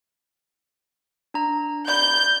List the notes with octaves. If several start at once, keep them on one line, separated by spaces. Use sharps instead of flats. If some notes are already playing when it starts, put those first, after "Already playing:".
D4 A#5
D5 B5 G6